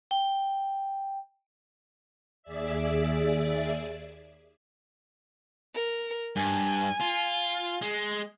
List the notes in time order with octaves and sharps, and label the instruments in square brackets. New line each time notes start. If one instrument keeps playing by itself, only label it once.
[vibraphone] G5
[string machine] D#2 G#4 D5 E5
[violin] A#4
[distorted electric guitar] G2 [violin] G#5
[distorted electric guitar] F4
G#3